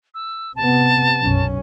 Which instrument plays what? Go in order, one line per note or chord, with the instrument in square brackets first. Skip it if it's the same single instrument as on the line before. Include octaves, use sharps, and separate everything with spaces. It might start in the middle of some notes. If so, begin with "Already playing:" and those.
[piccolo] E6
[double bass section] C3 B3 [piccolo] A5
[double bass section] B1 F#2 C#4